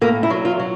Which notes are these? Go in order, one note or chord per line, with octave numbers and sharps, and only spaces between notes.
A2 A#3
E4
F#3
F4
F#3